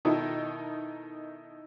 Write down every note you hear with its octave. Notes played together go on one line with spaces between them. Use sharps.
B2 D#3 D#4 E4 A4